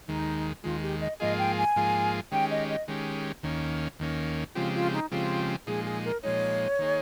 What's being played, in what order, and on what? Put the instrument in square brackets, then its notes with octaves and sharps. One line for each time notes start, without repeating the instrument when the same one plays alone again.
[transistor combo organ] D#2 D#3 G#3 [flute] D#4
[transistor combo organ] D#2 D#3 G#3 [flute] F4
[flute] G4
D#5
[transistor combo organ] G#2 F3 A#3 F4 G#4 [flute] D#5
[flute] G5
G#5
[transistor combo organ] G#2 F3 A#3 F4 G#4
[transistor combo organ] D#3 G#3 C#4 G4 [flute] G5
[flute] D#5
D#5
[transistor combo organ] D#3 G#3 C#4 G4
D#2 D#3 A#3 C#4
D#2 D#3 A#3 C#4
[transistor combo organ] C#3 F3 G#3 C4 G4 [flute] F4
[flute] F4
D#4
[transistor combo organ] C#3 F3 G#3 C4 G4 [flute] F4
[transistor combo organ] A#2 F3 G#3 D#4 [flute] G#4
[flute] G#4
A#4
[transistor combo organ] A#2 F3 G#3 D#4 [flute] C#5
[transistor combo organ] D#3 A#3 D#4 G#4